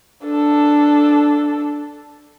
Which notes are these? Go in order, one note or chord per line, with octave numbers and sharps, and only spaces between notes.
D4 A4